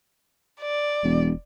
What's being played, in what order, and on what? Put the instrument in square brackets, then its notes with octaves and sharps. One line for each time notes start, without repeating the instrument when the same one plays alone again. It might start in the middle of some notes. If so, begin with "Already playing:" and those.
[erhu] D5
[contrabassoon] E1